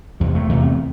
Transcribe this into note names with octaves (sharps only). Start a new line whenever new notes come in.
E2 C3 G3
A3
E2 C3